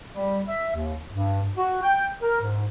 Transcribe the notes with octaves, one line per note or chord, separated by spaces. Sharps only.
G3
E5
D#2
G2
F#4
G5
A#4
G#2